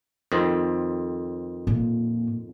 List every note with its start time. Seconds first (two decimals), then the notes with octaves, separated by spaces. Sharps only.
0.32 F2 D#3 C4
1.67 A#2